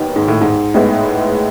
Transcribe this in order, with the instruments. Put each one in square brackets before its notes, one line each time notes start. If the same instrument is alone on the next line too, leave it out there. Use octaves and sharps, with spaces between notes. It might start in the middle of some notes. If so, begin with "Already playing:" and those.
Already playing: [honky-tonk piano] D#2 D#3 F#3 B3
[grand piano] G#2
A2
G#2
[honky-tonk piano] A2 G#3 B3